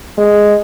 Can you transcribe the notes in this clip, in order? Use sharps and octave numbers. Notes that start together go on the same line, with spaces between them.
G#3